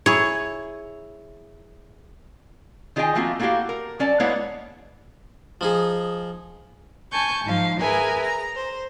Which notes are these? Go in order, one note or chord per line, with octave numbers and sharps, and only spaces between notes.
E4 G#4 C#5
D#3 F4 G#4 D#5 G5 G#5
F3 A3 A#3 C4 F4 F#4
A3 A#3 E4 F#4 G4 F5
A#4
F#3 C#4 D5 A5
G#3 A#3 B3 E4 C#5 F#5
F3 D#4 G#4
G#5 A5 C#6 G6
G#2 F3 F5
G#4 A#4 B4 E5 G#5
A#5
C5